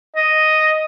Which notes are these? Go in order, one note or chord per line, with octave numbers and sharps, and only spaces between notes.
D#5